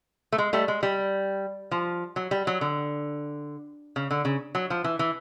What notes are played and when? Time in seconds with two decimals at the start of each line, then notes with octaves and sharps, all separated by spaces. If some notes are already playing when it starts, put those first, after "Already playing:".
0.33 A3
0.38 G#3
0.53 G3 A3
0.68 G#3
0.83 G3
1.71 F3
2.16 F#3
2.31 G3
2.47 F#3
2.61 D3
3.96 C#3
4.11 D3
4.25 C#3
4.55 F#3
4.70 F3
4.84 E3
4.99 E3